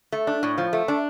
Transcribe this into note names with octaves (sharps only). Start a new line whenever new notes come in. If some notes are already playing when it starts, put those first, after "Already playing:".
A3
D4
A2
F3
A3
D4